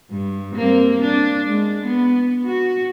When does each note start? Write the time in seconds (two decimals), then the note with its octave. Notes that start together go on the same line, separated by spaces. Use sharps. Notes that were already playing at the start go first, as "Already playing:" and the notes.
0.10 G2
0.56 A#3 C4
1.00 D4
1.47 G#3
1.85 B3
2.45 F#4